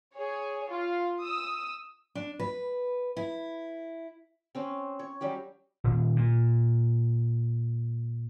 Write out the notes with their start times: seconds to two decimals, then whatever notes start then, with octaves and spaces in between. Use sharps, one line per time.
0.15 G#4 C#5
0.68 F4
1.22 D#6 E6
2.15 D4
2.39 B4
3.17 E4
4.55 C4 C#4 C5
4.99 C#5
5.21 F#3 G3 C#4 G4
5.84 D#1
6.16 A#2